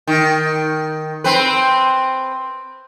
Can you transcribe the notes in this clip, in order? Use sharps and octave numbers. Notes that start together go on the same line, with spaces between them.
D#3
C4 B4